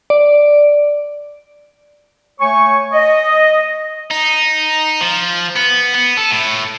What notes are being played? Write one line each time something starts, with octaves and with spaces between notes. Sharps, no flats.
D5
A3 C#5 G#5 C#6
D#5
D#4
F3
B3
B3
A4
A2